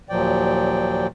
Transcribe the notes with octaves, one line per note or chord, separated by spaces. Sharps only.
D#2 A#2 F3 F#3 D5 G5